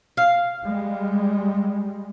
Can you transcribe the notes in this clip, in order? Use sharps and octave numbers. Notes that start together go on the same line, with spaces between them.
F5
G3 G#3